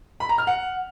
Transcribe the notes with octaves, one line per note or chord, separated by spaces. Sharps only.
B5
A#5
F6
F#5